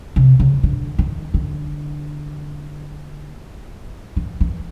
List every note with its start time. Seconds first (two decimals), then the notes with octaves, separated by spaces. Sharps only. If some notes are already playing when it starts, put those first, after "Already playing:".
0.16 C3
0.40 C#3
0.63 D3
0.99 D#3
1.34 D3
4.17 E3
4.41 E3